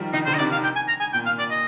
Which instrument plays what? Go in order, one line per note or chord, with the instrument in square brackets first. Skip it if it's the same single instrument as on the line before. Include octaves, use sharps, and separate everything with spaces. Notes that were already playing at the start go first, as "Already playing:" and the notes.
Already playing: [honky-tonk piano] D#3 F3 G3
[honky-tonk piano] D#3 [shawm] D#4
[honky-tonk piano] D3 [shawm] C5
[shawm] D#5
[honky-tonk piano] C3 D#3 [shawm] D5
[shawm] F5
G5
G#5
A#5
G#5
[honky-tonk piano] A#2 [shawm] G5
[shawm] F5
D5
D#5